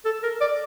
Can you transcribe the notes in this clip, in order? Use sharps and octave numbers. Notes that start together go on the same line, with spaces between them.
A4
A#4
D5